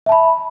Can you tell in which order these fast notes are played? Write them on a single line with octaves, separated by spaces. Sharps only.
E5 A5 B5